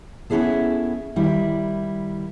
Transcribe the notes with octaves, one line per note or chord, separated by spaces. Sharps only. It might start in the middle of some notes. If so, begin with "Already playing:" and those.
B3 C#4 D#4 E4 G#4 A4
D#3 G3 E4